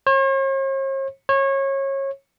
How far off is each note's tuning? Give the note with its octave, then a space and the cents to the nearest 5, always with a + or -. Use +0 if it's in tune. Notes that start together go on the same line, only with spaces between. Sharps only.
C#5 -45
C#5 -25